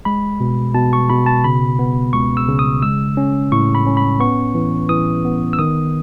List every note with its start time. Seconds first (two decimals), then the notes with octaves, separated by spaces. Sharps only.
0.05 G#3 B5
0.40 B2
0.74 B2 A5
0.93 C#6
1.10 B2 B5
1.26 A5
1.44 C#3 B5
1.79 B3
2.13 C#2 C#6
2.37 E6
2.48 C#3
2.59 D#6
2.82 G#3 E6
3.17 C#4
3.52 A2 C#6
3.75 B5
3.87 C#4
3.97 B5
4.20 B3 C#6
4.55 E3
4.89 E3 D#6
5.25 B3
5.53 E6
5.59 D#3 D#6